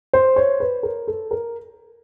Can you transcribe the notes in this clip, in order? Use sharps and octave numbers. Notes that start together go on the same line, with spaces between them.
C5
C#5
B4
A#4
A4
A#4